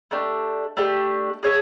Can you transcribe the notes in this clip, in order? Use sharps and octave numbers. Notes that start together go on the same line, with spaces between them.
A3 D4 G4
A3 D4 G4
G#4 C#5 E5 A5